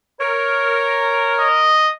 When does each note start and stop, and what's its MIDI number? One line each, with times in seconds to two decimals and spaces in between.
0.20 1.71 70
0.20 1.48 73
1.39 1.92 75